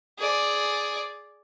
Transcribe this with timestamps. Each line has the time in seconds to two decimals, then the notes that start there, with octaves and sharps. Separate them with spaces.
0.18 G#4 D5